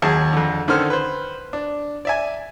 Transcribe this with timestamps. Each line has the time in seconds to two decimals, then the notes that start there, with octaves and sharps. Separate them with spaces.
0.02 D#2 F#3 G#4 A5
0.33 F2 D3
0.68 D3 D#3 C#4 A4 C5 F6
0.90 B4 C5
1.53 D4
2.05 D5 E5 G#5